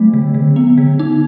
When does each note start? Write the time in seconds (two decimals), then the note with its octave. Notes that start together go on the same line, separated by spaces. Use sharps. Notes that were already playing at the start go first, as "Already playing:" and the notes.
Already playing: F#3 A3
0.14 D3
0.34 D3
0.56 B3
0.78 D3
0.99 D#4